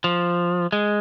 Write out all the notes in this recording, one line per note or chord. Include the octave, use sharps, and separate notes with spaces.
F3
G#3